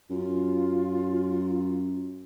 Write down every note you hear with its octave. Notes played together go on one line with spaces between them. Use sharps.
F#2 F4